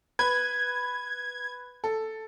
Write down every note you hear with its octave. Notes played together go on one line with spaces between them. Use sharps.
B4 G#6
A4